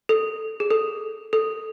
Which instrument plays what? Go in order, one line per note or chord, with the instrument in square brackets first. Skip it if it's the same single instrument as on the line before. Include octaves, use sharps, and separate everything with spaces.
[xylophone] A4
G#4
A4
A4